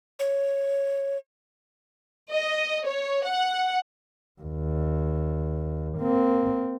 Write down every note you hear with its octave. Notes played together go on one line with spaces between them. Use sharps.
C#5
D#5
C#5
F#5
D#2
A#3 C4